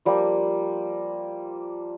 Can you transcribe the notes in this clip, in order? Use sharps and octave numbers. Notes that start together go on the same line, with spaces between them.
F3 G3 A#3